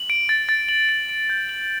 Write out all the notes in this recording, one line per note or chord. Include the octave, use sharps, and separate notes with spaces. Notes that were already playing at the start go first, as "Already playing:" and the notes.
Already playing: F#7
D7
A6
A6
F#7
D7
D7
G6
F#7